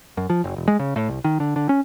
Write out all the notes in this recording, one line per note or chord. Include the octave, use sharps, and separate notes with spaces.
F#2
F3
F#1
E1
G#3
C#3
A2
C2
D#3
D3
D3
C#4